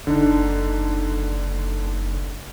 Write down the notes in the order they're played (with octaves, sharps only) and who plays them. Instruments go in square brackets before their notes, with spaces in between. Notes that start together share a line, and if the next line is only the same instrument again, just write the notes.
[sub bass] F#1 [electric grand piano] D3 D4 D#4